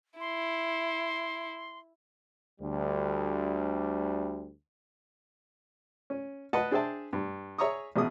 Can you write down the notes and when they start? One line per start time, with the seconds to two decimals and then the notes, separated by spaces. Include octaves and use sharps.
0.20 E4 C6
2.61 D2 G3
6.10 C#4
6.53 B4 D#5 F#5 A5
6.71 D4 G#4 C5 E5 G5 A5
7.13 G2
7.58 G#4 C#5 E5 A#5 C#6 D#6
7.96 A1 B2 G#4 D#6